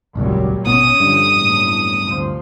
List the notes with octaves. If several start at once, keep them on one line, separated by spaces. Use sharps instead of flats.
D#1 G#1 C#2 A#2 F#3 G3
G#1 B2 B3 C#4 D#6
G2 D3 F3
F#1 E2 A2
D2 C3 F3